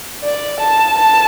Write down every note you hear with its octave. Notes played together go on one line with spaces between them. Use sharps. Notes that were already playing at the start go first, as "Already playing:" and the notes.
D5
A5
A5